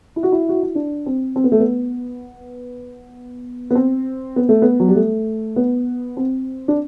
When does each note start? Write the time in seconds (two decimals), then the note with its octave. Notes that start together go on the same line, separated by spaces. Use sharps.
0.16 E4
0.23 F#4
0.32 E4
0.49 F#4
0.63 E4
0.75 D4
1.06 C4
1.36 C4
1.44 B3
1.52 A3
1.60 B3
3.71 B3
3.75 C4
4.36 B3
4.49 A3
4.62 B3
4.80 F#3
4.88 G3
4.95 A3
5.56 B3
6.17 C4
6.68 D4